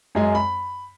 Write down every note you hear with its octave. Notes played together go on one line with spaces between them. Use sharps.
F#2 G#3 G#5
B5